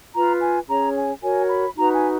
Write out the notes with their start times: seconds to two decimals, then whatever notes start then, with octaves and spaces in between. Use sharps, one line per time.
0.14 F4 B4 A#5
0.41 G#5
0.68 C#4 G#4 C#5 A#5
0.95 G#5
1.23 F#4 A#4 C#5 G#5
1.50 B5
1.77 D#4 F#4 B4 A#5
1.94 G#5